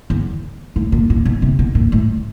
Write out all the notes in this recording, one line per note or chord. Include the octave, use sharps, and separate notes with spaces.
E2
A2
A#2
A#2
B2
C3
B2
A#2
A2